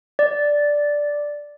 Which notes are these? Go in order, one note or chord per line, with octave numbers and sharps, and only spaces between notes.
D5